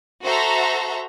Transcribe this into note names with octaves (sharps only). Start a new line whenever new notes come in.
F#4 A4 C5 E5 A#5